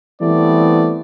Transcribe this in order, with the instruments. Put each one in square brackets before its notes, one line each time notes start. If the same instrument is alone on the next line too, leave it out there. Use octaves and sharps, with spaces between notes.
[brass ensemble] E3 G3 A3 B3 C4 D5